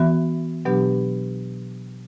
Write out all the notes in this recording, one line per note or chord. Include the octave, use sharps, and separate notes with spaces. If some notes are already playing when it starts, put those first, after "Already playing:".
Already playing: E3 B3 F#4 E5
B2 F#3 B3 D4 G4